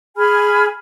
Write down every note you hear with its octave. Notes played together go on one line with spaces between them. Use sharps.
G#4 G#5 B5 F6